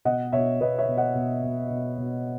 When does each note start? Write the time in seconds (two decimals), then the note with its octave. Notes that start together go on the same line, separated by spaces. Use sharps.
0.05 B2 D#5 F#5
0.32 B2 C#5 E5
0.60 B2 B4 D#5
0.78 C#5 E5
0.88 B2
0.97 D#5 F#5
1.15 B2
1.43 B2
1.70 B2
1.98 B2